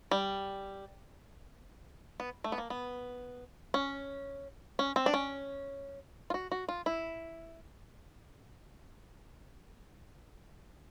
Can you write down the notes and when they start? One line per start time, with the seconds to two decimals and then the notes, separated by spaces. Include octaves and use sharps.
0.11 G3
2.20 B3
2.44 A3
2.52 B3
2.58 A#3
2.70 B3
3.74 C#4
4.79 C#4
4.96 C4
5.06 D4
5.14 C#4
6.30 F4
6.34 F#4
6.52 F#4
6.69 F4
6.86 E4